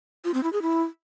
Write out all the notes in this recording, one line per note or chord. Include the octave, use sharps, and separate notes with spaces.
F4
C4
E4
G#4
E4